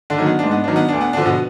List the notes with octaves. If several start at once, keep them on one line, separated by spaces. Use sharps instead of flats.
D3 D4
D#3 F#3
B3
G#2 D4
B3
D#3 F#3 D4
B3
D2 D4
B3
D3 F3 D4
B2 B3